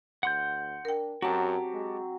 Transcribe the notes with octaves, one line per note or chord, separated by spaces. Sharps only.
D2 F#5 C6 G6
D4 A#4 G5
F#2 F#3 C4 F#4 G4 A5
G#3